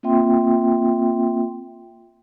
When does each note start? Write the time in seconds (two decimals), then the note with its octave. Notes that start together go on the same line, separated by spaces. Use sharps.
0.03 A#3 C4 F4 E5 G5 C6